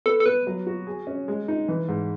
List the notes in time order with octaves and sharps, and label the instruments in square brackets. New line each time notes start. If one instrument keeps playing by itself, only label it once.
[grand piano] B3 [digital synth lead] A4
[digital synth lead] A4
[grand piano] B3 [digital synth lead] B4
[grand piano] F#3
F#4
G#4
C#4
G#3
D#4
E3
G#2